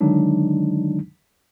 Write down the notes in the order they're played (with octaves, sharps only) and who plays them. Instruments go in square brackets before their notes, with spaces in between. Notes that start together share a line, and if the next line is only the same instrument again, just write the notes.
[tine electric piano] D3 D#3 F#3 G#3 D4 D#4